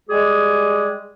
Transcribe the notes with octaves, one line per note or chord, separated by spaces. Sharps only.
G3 G#3 G4 G#4